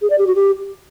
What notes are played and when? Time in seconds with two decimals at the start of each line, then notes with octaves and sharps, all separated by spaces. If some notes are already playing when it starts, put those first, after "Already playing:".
0.01 G#4
0.09 D5
0.18 G4
0.26 F#4
0.35 G4